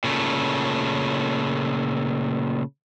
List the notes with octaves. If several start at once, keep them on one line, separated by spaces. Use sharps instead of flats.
A#2 C#3 A3